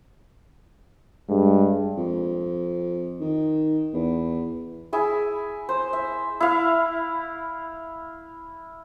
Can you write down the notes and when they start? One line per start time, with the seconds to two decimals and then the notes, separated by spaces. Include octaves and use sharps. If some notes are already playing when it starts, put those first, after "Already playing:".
1.30 G2 G#3
1.97 F2
3.21 D#3
3.94 E2
4.93 E4 G#4 E5
5.69 C5
5.93 E5
6.40 E4 F5